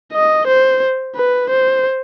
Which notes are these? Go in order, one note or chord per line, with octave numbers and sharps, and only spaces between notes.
D#5
C5
B4
C5